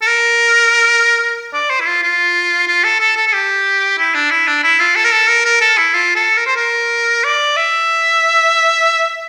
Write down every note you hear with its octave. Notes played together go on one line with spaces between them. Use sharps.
A4
A#4
D5
C5
E4
F4
F4
F4
A4
A4
A4
A4
G4
E4
D4
E4
D4
E4
F4
A4
A#4
A4
A#4
A#4
A4
E4
F4
A4
A#4
C5
A#4
D5
E5